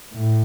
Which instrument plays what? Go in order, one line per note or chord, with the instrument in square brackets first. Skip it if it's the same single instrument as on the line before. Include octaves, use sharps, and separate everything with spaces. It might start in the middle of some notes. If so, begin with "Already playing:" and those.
[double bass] A2